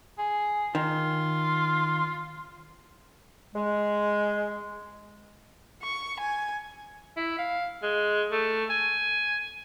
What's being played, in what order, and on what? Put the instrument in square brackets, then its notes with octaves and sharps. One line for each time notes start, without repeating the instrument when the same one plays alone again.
[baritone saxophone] G#4
[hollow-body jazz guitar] D#3 [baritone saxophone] F4
[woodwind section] G#3
[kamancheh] C#6
G#5
[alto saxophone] E4
F5
G#3
A3
G#5